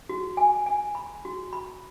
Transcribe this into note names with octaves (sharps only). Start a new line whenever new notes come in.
F#4
G#5
G#5
B5
F#4
B5